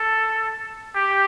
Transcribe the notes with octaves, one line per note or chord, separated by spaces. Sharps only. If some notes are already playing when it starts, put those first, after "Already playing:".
Already playing: A4
G4